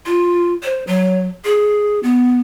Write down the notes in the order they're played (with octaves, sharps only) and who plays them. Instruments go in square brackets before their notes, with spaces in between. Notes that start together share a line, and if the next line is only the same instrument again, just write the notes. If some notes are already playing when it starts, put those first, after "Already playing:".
[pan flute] F4
C5
F#3
G#4
B3